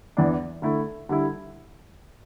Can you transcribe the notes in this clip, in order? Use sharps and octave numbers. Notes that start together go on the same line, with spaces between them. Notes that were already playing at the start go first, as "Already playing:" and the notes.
E2 E3 B3 D4
D3 A3 E4
D3 G3 E4